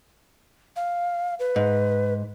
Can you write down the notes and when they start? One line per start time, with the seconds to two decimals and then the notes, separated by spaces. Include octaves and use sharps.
0.76 F5
1.40 B4
1.56 G#2